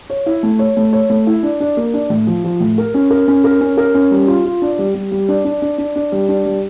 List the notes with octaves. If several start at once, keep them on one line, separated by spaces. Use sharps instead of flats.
C#5
E4
A3
C#5
A3
C#5
A3
E4
D4
D4
A#3
D4
A2
F3
F3
A2
A#4
C#4
A#4
C#4
A#4
C#4
A#4
C#4
G3
F4
F4
D4
G3
G3
G3
D4
D4
D4
D4
D4
G3
D4
G3